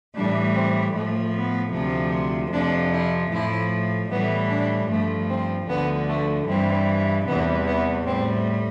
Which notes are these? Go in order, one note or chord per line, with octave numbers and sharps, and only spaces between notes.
A2 E3 G3 D4
C4
A2 F3 A3
B3
D2 C3 F3
F2 C3 F3 D4
E4
A2 F3 E4
A2 E3 G3 B3
D4
G2 F3 A3
C4
D2 D3 F3 B3
A3
G2 E3 G3 C4
E2 C3 E3 G3 B3
B3
A2 G3 C4